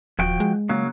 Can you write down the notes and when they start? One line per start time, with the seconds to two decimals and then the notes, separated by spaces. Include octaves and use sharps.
0.19 D#1 F3 F#4 G5
0.40 G#3
0.69 C#3 F#3 A#3